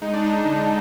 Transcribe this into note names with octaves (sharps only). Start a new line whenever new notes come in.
G#3 D#4
D4
G#3 D#4
D3